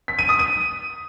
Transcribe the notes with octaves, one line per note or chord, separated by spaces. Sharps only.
B6
D#7
D#6
D#7